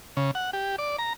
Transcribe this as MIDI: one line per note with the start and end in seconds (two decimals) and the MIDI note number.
0.17 0.31 49
0.35 0.51 78
0.53 0.76 67
0.78 0.96 74
0.99 1.13 82